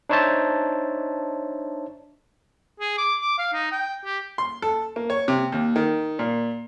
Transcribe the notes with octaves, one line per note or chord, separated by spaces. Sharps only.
D4 D#4 C5 C#5 E5 A5
G#4
D6
D6
F5
D#4
G5
G4
C6
A4
A#3
C#5
C3
D#2
D#3
A#2